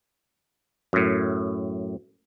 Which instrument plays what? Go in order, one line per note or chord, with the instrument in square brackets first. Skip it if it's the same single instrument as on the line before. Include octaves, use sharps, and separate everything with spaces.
[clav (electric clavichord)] F#2 A2